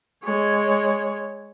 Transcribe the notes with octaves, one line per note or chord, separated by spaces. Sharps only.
G#3 C#5